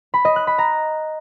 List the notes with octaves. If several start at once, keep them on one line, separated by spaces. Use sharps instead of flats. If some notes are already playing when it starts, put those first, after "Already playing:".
B5
D#5
F#6
B5
A#5